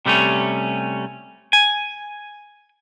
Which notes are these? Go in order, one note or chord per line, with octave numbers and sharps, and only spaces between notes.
C3 G3 A3 C4 C#4
G#5